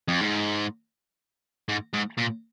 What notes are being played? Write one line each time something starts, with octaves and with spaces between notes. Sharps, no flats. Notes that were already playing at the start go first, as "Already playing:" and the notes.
F2
G#2
G#2
G#2
A#2